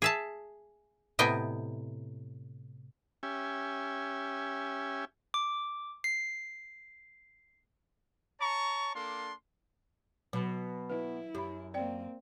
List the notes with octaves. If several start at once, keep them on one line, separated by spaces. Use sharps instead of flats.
G#4 E5 A5
A2 C3 B3 D#5 G5 G#5
C#4 G4 E5 G#5
D6
C7
C#5 A5 A#5 C#6
A#3 D4 A4 C6
B2 F#3
E4 B4
F#2 G4 B5
A#3 C4 D5 G5